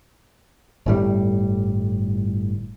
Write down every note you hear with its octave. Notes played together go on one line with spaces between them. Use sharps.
G1 A2 G3